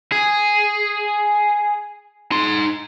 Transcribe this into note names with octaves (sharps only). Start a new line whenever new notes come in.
G#4
D#4 C6